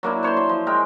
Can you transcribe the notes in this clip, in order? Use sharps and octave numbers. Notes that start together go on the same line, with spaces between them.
F#3 A#3 D4 E4
C5 C#5 A5 C6
C6
F3
G#3 A#4 G5